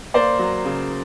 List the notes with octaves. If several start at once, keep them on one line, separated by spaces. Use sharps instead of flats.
A#3 C5 D5
F#3
C#3